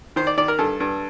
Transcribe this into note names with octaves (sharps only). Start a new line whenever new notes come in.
D#3 C5
D5
D#3 D5
A#4
G2 A4
G2